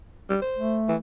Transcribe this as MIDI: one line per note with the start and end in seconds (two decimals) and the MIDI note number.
0.30 0.38 55
0.42 0.78 72
0.58 0.98 57
0.89 0.96 52